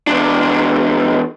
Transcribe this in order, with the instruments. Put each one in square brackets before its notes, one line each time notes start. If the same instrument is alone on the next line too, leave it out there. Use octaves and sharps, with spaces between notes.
[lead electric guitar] E2 D4